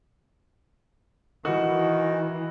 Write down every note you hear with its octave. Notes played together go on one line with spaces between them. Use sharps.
D#3 E3 F#4